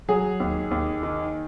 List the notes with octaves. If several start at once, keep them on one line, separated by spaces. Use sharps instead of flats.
F#3 G#4
D#2
D#2
D#3